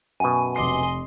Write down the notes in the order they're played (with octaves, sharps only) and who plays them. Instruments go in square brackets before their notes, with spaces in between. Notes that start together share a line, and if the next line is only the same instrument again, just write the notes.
[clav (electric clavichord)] F#2 B2 [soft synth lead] G#5
[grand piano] F1 D6 C7 [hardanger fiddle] D#5 C6